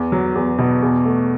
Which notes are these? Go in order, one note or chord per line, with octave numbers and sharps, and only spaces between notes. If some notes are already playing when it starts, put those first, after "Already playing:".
Already playing: E2
F#3
E2
B2
E2
A3